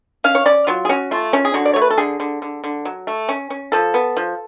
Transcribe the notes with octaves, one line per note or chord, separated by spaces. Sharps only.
C#4 F5
C#5
C#4 D5
F#3 F4
G#4
C#4 F#4
A3 F4
C#4
G#4
D3 F#4
D5
A3 C#5
B4
A4
D3 G#4
D3
D3
D3
F#3
A3
C#4
C#4
F3 A4
B3
F3